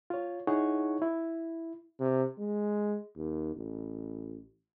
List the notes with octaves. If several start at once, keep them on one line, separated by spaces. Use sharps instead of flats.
F4 C#5
D#4 E4 G#4 C#5 F#5 C#6
E4
C3
G#3
D#2
A1